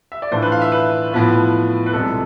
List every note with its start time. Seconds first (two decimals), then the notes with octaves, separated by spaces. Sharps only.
0.12 E5
0.22 D5
0.31 A2 E3 A3 D4 F4 C5
0.42 B4
0.52 F5
0.62 E5
0.72 B4
1.12 A2 F3 B3 F4
1.86 B4
1.93 C2 C3 F3 G#3 A4